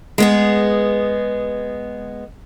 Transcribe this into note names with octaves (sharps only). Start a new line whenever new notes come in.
G#3 B3 G#4